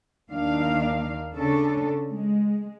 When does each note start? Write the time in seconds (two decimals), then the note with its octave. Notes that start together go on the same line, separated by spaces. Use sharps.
0.31 D#2 D#3 D4 F5
1.35 C#3 C#4 D4 A4
2.10 G#3